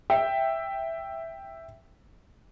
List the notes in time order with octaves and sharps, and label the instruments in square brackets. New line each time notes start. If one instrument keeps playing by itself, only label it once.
[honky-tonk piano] E5 G5